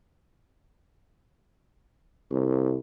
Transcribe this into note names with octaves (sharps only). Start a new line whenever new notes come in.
C2